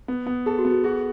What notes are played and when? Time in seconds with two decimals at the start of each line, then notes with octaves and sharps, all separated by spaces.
0.08 B3
0.27 B3
0.46 G#4 A4
0.59 F#4
0.65 B3
0.71 F#4
0.84 F#4 G#4